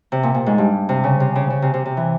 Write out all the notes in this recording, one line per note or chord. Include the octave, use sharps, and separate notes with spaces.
C3
A#2
A#2
G#2
G2
C3
C#3
C3
C#3
C#3
C3
C3
C3
E3